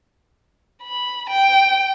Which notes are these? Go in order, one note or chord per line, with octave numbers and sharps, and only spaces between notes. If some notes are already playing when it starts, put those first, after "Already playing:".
B5
G5